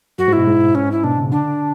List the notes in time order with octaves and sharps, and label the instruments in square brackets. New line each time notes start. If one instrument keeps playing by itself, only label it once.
[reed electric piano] F#2 [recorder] F#4
[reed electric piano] G#2
[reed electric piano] B2 [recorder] E4
[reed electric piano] G#2
[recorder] C#4
E4
[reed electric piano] B2 [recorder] D4
[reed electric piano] C#3
[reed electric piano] D3 [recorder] D4